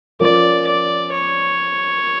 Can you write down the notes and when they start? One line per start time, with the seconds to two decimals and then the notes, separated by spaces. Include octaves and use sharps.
0.20 F3 C#4 F4 A#4 D5
0.67 D5
1.14 C#5